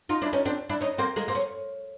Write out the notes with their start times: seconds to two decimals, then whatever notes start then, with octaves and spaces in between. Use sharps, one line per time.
0.09 D#4 F4
0.22 D4 E4
0.33 C#4 D#4
0.45 C4 D4
0.69 D4 E4
0.81 C#4 D#4
0.98 A#3 C4
1.16 G#3 A#3
1.28 A#3 C4
1.35 C#4